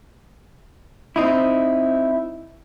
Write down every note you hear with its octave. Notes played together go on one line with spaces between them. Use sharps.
C4 D#4 E4